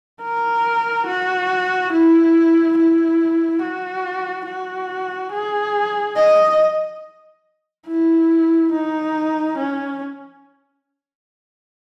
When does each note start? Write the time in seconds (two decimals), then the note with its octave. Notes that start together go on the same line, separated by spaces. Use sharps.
0.22 A#4
1.07 F#4
1.93 E4
2.78 E4
3.62 F#4
4.47 F#4
5.32 G#4
6.16 D#5
7.87 E4
8.72 D#4
9.58 C#4